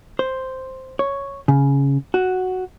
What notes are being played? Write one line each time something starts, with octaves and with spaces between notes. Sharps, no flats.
C5
C#5
C#3
F#4